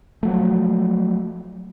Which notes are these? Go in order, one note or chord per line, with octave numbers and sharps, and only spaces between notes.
F3 F#3 A3